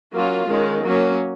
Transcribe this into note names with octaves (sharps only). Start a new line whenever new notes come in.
F#3 A#3 C#4 F4
D#3 G#3 C#4
F#3 A#3 C#4